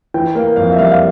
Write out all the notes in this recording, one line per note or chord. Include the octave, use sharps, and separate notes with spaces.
E3 G5
A#3
F2 F5
E5
G3 F5
F5